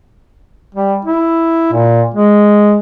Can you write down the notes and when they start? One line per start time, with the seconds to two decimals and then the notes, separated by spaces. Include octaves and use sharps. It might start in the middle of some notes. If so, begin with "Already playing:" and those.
0.75 G3
1.05 E4
1.73 A#2
2.14 G#3